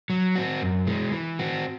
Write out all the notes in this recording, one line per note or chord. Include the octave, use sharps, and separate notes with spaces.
F#3
C4 F#4
F#2
E3 G#3
E3
C4 F#4